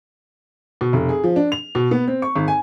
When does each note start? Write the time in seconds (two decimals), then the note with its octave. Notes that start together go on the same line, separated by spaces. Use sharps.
0.81 B2
0.93 F1
1.09 G#4
1.24 F3
1.36 D4
1.52 F7
1.75 B2
1.91 B3
2.08 C4
2.22 C#6
2.36 G#1
2.48 G#5